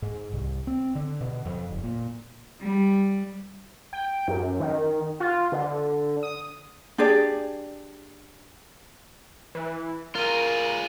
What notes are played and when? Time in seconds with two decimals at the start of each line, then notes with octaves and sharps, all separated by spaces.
0.02 G#2
0.33 C2
0.67 C4
0.95 D3
1.21 B2
1.45 F2
1.71 F#1
1.84 A#2
2.61 G3
3.93 G5
4.28 F#2
4.60 D#3
5.20 F4
5.52 D3
6.23 D#6
6.98 D4 G4 G#4 D5
9.55 E3
10.15 F4 G#4 A#4